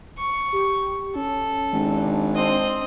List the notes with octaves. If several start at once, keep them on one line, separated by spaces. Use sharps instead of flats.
C#6
G4
C#4 A4
G#1 D4
C4 D#5 C6